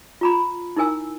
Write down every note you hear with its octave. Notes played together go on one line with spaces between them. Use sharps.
F4 A#5 B5
D#4 E4 A#4 G#5 E6